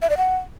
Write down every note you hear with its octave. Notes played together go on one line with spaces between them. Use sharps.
E5
D5
F#5